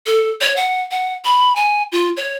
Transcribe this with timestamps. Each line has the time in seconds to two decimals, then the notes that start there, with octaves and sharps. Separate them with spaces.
0.06 A4
0.41 C#5
0.56 F#5
0.91 F#5
1.25 B5
1.56 G#5
1.92 F4
2.17 C#5